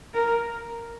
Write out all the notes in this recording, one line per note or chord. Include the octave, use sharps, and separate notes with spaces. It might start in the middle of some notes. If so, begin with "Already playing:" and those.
A#4